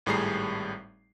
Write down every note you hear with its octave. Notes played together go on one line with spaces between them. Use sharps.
G#1 A2 G3 G#4 A#5 C7